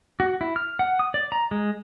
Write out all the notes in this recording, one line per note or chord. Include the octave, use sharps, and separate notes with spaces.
F#4
E4
F6
F#5
D#6
D5
A#5
G#3